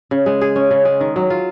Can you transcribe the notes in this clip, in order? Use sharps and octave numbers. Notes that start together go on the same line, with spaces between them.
C#3
G#3
G#4
C#4
C#3
G#3
D#3
F#3
F4